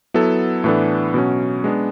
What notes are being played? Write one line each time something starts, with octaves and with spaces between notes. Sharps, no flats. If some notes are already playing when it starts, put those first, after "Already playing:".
F#3 B3 E4 A4
A2 E3 B3 D4 A4
B2 F#3 C#4
G#3 B3 D4